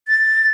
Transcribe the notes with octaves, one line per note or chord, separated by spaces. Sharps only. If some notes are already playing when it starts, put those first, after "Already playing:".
A6